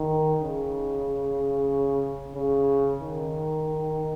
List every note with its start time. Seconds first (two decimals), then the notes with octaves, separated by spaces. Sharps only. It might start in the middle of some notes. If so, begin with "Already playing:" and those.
Already playing: D#3
0.42 C#3
2.35 C#3
3.01 D#3